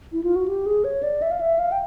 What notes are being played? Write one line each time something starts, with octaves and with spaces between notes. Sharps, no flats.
E4
F4
F#4
G4
G#4
C#5
D5
E5
F5
E5
F5
G5